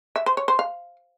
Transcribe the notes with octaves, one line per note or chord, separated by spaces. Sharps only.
E5
C5
C#5
C5
F5